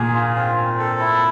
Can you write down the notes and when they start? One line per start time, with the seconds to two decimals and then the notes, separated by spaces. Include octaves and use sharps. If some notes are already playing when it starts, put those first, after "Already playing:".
Already playing: A#2 G#4
0.14 F4
0.36 C4
0.57 C4
0.79 A4
1.00 E4